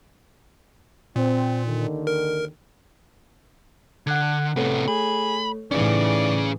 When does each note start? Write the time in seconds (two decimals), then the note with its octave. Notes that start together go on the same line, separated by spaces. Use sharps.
1.16 A#2 C4
1.66 D#2 D3 D#3
2.07 A#4
4.07 D3 F#5 F#6 G#6
4.56 A2 C3 A3 B3 A4 C#5
4.88 G#4 B5
5.71 A2 E3 C#4 D#4 G#4 D5